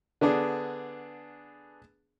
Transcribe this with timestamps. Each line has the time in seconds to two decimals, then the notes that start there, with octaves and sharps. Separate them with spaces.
0.21 D3 B3 D4 G#4